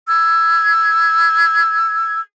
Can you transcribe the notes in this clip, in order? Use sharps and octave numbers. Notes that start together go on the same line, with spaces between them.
E6 G#6